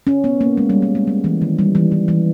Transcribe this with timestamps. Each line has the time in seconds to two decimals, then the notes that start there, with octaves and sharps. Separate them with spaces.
0.07 C#4
0.24 B3
0.41 A#3
0.57 G#3
0.70 G3
0.82 G3
0.95 G#3
1.07 G3
1.24 E3
1.42 D#3
1.59 G3
1.75 E3
1.92 E3
2.08 E3